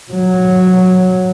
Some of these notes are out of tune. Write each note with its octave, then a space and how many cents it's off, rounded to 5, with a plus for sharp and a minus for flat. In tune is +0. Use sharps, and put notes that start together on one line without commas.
F#3 -10